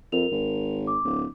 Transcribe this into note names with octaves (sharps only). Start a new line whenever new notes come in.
F2 A#4 F7
G#1
D6
D1